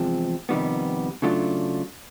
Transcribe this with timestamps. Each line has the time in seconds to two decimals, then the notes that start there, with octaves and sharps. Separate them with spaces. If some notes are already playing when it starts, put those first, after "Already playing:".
Already playing: E2 C3 F3 G#3 C4
0.49 F2 C3 D#3 G3 B3
1.22 C#3 F#3 A3 D4 F4